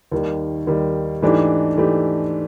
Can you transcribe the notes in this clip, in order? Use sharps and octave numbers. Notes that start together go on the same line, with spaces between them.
D#2 D#3 G3
D#2 D#3 G3
G#2 E3 A3 D4 G4
G#2 E3 A3 D4 G4